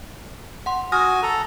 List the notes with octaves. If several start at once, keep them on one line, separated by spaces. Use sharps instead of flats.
F#5 C6
F#4 G#5 D#6 F6 A#6
A4 A#5